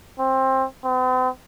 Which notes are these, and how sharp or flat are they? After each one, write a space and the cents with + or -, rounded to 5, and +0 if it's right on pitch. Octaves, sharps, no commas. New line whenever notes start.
C4 +20
C4 -45